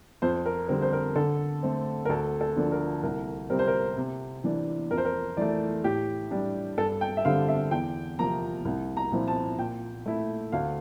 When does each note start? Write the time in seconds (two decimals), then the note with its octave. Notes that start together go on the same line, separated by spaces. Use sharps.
0.22 F2 C5
0.46 A#4
0.68 D3 G3 C4 A#4
0.82 C5
0.93 A#4
1.16 D3 A4
1.63 A3 C4
2.05 A#4
2.09 D2 A4
2.41 A4
2.56 D3 F3 A#3 D4
2.72 A#4
3.03 C2 A#4
3.50 C3 G3 C4 A#4
3.59 C5
3.67 A#4
3.97 C3
4.44 E3 A#3 D4
4.91 F2 A#4
4.98 C5
5.05 A#4
5.37 E3 A3 D5
5.84 A2 G4
6.31 G3 D4
6.78 G2 A4
7.01 G5
7.17 E5
7.25 D3 G3 C4 F5
7.48 E5
7.71 E2 G5
8.19 C3 F3 A#3 A#5
8.65 C2
8.97 A#5
9.12 A#2 F3 C4 E4
9.28 A5
9.58 A#2 G5
10.06 A3 E4
10.52 D2 F5